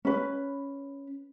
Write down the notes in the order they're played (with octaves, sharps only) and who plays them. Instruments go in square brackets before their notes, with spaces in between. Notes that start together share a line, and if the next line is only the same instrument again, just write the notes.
[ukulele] C#4 B4